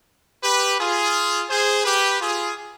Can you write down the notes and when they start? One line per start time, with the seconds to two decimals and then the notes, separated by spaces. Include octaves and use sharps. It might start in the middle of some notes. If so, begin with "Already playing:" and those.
0.43 G4 B4
0.79 F4 G#4
1.50 G#4 C5
1.85 G4 B4
2.21 F4 G#4